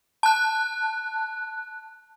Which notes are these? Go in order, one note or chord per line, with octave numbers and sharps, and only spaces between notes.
A5 F#6